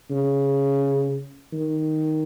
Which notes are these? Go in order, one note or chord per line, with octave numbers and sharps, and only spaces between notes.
C#3
D#3